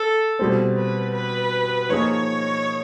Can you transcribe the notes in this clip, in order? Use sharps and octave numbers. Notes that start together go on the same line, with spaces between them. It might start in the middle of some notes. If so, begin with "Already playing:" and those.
Already playing: A4
B2 G3 C4
B4
B4
F3 A#3 D#4 G#4 C#5